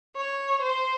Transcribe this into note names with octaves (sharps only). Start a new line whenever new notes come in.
C#5
C5